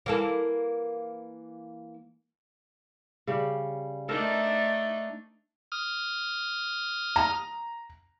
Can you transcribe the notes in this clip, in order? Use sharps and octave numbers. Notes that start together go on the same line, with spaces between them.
E3 A#3 A4
C#3 G3
A3 D4 D#4 A4 A#4 C5
D#6 F6
A#5